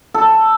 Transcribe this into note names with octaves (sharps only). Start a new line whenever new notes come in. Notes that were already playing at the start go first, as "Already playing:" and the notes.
A4